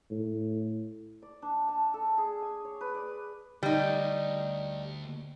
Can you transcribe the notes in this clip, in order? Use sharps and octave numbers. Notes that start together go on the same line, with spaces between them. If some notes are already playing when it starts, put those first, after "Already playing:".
A2
D5
D4
A5
A4
G#4
G#5
C#5
B4
D5
D2 G3 D#4